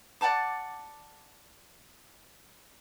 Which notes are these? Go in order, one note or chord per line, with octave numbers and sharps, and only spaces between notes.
D5 F#5 A5 D6